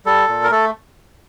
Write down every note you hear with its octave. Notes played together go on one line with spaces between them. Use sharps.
G3 A4
A#2
A#4
A3 A4